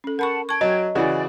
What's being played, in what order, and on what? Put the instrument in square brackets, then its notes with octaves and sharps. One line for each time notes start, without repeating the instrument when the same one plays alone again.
[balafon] C#4 A4
[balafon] A#4 B5 C#6 [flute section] F#5 A5
[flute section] G5 G#6 [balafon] A5 C#6
[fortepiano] F#3 [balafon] C#5 [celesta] D#5
[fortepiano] C#3 E3 F#4 [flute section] D5